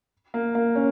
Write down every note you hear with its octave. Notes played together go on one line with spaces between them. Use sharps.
A#3
A#3
C#4